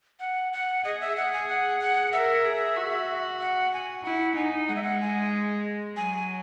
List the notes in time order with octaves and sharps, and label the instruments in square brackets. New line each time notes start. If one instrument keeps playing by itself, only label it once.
[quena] F#5
F#5
[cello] G#4 [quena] D#5
[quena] E5
[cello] G#4 [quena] F#5
[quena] G#5
F#5
F#5
[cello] A#4 [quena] E5
[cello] G#4
F#4
[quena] F#5
G#5
[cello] E4 [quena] F#5
[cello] D#4 [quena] G#5
[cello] G#3 [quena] F#5
[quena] E5
F#5
G#5
[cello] F#3 [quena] G#5